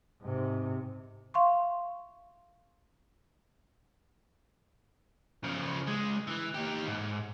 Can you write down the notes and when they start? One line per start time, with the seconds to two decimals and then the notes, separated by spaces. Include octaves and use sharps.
0.21 G#2 C3
1.34 E5 F5 C6 C#6
5.44 C#3 F3
5.87 C#2 G#3
6.27 E3
6.54 D#4 G4
6.88 G#2